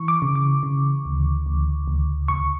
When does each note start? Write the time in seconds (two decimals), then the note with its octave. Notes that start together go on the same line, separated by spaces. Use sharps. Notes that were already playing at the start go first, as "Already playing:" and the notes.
Already playing: E3 C#6
0.08 D6
0.22 C#3
0.35 D6
0.63 C#3
1.05 D2
1.46 D2
1.88 D2
2.28 D2 C#6